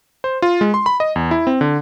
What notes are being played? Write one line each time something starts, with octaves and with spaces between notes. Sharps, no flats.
C5
F4
G#3
C6
B5
D#5
E2
E4
C4
D3